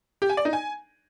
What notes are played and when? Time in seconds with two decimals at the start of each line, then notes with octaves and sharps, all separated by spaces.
0.22 G4
0.30 G#5
0.37 D5
0.45 D#4
0.53 G#5